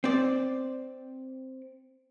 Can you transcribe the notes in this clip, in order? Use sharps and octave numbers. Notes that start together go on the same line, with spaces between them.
C4 D5